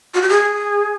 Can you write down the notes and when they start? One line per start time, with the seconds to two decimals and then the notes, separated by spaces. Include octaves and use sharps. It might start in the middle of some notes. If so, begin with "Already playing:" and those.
0.14 F#4
0.22 G4
0.29 G#4